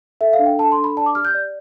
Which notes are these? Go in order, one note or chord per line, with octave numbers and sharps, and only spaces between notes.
A4 E5
F5
D4
G5
A4 A5
C6
D4
B5
D5 A5
D6
G4 F6
G6
D5